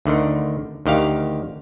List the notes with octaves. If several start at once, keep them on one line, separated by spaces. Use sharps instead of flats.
D2 D3 D#3
D2 D#3 G4 F5